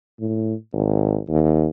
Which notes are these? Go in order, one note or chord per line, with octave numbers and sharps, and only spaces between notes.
A2
G#1
D#2